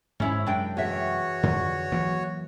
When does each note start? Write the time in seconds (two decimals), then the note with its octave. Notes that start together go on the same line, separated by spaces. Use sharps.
0.20 G#2 C#4 E4 C#5
0.46 F#2 C3 G#3 D4 G5
0.77 E2 F#4 C#5 E5
1.43 F2 D3
1.92 E3 F#3 A#3